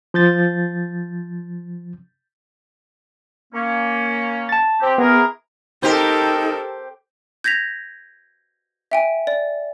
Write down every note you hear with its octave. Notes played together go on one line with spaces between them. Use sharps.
F3 G6 A6
A#3 C#4
A5 A6
C4 G4
E3 B3 G#4 A#4
D#4 G4 A4 A#4 C5
G6 G#6 A#6 B6 F7
E5 G5 G#5
D5